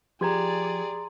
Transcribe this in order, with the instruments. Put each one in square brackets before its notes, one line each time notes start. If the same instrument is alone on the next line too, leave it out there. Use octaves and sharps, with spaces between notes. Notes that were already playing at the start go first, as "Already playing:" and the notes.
[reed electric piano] F3 G#6 [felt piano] G4 [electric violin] G#4 D5 [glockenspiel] A#5 C6